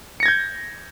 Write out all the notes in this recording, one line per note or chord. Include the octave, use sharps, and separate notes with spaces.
G6 G#6 A#6 C#7